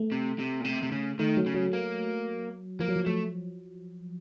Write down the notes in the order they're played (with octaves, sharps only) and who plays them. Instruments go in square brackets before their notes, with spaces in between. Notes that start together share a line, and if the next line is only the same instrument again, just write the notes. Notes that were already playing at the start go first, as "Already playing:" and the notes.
Already playing: [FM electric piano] A3
[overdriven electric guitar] C3
C3
A#2
C3
C3
C#3
[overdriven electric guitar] D#3 [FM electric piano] A3
[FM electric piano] F#3
[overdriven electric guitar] C#3
[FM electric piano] F#3
[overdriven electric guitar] A#3
[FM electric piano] F3 [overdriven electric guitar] A#3
[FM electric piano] F#3
F3
[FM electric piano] F#3 [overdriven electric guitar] A3